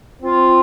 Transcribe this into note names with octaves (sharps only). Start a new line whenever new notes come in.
C4 F4